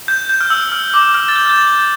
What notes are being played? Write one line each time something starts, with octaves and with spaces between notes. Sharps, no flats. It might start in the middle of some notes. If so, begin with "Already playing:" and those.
G6
G6
F6
E6
F6
D6
F6
A6
G6
G6
A6
G6